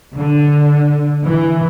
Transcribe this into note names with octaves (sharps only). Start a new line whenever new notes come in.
D3
E3